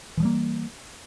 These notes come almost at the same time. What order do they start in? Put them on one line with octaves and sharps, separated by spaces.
E3 F3 G3 A#3